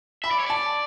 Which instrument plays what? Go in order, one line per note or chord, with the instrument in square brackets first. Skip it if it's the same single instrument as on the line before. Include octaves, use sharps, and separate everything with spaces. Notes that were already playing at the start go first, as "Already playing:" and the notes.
[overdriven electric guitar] E5 [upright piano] B5
[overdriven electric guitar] D5
C#5
[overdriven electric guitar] D5 [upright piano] A5